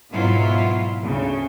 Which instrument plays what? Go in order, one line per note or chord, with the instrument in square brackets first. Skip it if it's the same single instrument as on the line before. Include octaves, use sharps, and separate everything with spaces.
[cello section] G#2 B2 F#3 E4 F4
D2 C#3